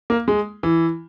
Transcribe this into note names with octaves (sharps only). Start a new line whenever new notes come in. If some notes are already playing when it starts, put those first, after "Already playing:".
A#3
G#3
E3